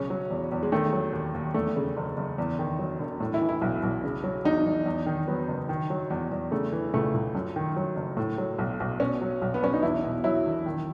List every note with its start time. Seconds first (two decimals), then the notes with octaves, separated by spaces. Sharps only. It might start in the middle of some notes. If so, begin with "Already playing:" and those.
Already playing: B1 C#3 C#4
0.10 F#3
0.31 E2
0.52 E2
0.63 G#3
0.72 D#3 A3
0.93 F#3
1.13 D#2
1.34 D#2
1.54 E2 A3
1.76 C#3
1.97 F#1
2.17 F#1
2.38 E2
2.59 D#3
2.79 F#3
2.99 E1
3.20 A2
3.34 E4
3.41 E3
3.49 E4
3.61 B1
3.83 B1
4.04 C#3
4.24 F#3
4.45 E2 D#4
4.66 E2
4.86 E2
5.06 D#3
5.27 F#3 B3
5.48 F#1
5.69 D#3
5.90 F#3
6.10 E2
6.31 E2
6.51 C#3 A3
6.72 E3
6.94 C#2 A3
7.14 C#2
7.35 F#2
7.56 D#3
7.76 F#3
7.96 F#1
8.17 A2
8.38 F#3
8.58 B1
8.80 B1
9.00 B2 C#4
9.22 F#3
9.42 B1
9.54 B3
9.63 B1 C#4
9.73 D#4
9.83 E2 E4
10.04 B2
10.24 F#3 E4
10.46 E1
10.66 D#3